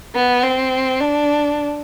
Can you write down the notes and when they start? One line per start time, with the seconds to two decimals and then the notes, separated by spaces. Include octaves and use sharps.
0.15 B3
0.43 C4
1.01 D4